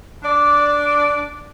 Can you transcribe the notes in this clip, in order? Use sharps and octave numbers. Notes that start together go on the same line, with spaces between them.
D4 D5